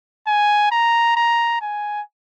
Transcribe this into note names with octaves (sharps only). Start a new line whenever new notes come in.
G#5
A#5
A#5
G#5